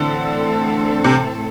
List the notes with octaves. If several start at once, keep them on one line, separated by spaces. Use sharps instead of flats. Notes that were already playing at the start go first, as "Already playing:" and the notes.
Already playing: A2 D3 E3 C4 A4
C3